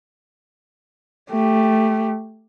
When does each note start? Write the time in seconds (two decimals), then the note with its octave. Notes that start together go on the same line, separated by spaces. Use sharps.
1.30 A3 G4